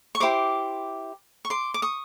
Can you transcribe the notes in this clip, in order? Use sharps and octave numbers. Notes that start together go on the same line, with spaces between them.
C#6
E4 G4 C5 C6 D6
C#6
C6 D6
D6
C#6 D#6